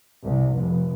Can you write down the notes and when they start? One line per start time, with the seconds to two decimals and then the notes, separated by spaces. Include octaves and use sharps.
0.22 C2
0.56 F1